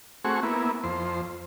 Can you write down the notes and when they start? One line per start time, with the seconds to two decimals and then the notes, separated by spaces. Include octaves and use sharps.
0.25 A3 C4 F#4 G#4 C#6
0.43 A#3 B3 E4
0.83 F2 C5